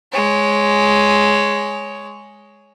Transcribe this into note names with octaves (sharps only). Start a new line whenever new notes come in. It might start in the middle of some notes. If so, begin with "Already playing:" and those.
G#3 C#5